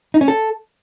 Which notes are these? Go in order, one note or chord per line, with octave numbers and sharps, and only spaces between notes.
D#4
C#4
A4